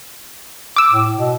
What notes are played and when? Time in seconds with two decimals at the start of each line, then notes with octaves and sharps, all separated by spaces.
0.76 D6 E6
0.91 A2
1.17 B2